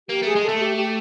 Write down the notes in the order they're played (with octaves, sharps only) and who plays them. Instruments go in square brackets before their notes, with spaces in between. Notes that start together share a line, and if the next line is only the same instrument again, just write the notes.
[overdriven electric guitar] A#3 [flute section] G4
[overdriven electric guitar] A3 [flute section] G#4
[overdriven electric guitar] G#3
[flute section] A4
[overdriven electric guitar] A3
[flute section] G4
G4